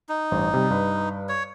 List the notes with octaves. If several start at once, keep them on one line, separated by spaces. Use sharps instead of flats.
D#4
A1 G2 C5
C3 G3
G2 B4
C#5